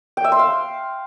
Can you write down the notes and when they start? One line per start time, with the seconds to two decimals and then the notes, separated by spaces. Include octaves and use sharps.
0.17 G5
0.24 E5
0.32 C6
0.39 F5